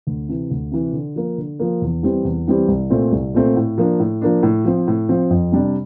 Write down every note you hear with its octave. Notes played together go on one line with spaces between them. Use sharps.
D2
C3 E3
D2
C3 E3
D3
F3 A#3
D3
F3 A#3
E2
E3 G3 C4 G4
E2
E3 G3 C4 G4
C2
A#2 A3 C4
C2
A#2 A3 C4
A2
F3 A#3 D4
A2
F3 A#3 D4
A2
F3 C4
A2
F3 C4
F2
C3 G3 D4